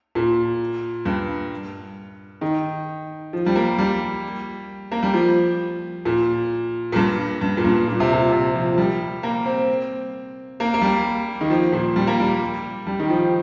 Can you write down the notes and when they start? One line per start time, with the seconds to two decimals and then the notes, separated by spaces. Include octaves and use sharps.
0.15 A#2
1.05 G2
2.41 D#3
3.33 F3
3.46 G3
3.55 A#3
3.78 G3
4.92 A#3
5.03 G3
5.14 F3
6.05 A#2
6.92 A#2
6.96 G2
7.41 G2
7.57 A#2
7.64 G2
7.88 A#2
8.00 C3
8.13 A#2
8.32 C3
8.55 F3
8.74 F3
8.78 G3
9.23 A#3
9.46 C4
10.60 A#3
10.74 A#3
10.82 G3
11.41 D#3
11.50 F3
11.73 A#2
11.96 G3
12.07 A#3
12.20 G3
12.87 G3
12.99 D#3
13.09 F3